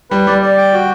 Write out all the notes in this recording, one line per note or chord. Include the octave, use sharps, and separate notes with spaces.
G3 B4
G3 D5
D5
G5
F#4